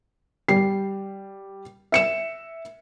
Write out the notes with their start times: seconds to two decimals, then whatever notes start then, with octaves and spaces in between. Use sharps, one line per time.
0.48 G3 C7
1.92 E5 C#7 E7